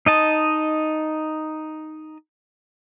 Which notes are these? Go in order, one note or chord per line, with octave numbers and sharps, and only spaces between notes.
D#4 D#5 A5